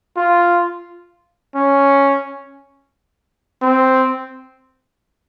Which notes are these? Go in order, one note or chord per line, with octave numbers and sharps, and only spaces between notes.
F4
C#4
C4